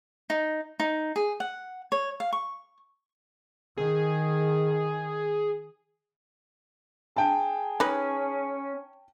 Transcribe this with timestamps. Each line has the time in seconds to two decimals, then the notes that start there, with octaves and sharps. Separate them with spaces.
0.30 D#4
0.80 D#4
1.16 G#4
1.40 F#5
1.92 C#5
2.20 F5
2.33 C#6
3.77 D#3 G#4
7.16 G#4 G5 A5
7.80 C#4 D#4 B4